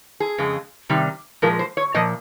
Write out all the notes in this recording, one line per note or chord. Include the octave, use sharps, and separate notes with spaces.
G#4
F2 C#3 G#3
C3 D#3 G3
A#2 F3 G#3 A#4
C5
C#5
A#2 F3 D#5